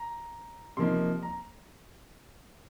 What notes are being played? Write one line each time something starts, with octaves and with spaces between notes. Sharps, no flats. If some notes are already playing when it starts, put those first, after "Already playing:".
Already playing: A#5
C3 F3 A#3 D#4 C6
A#5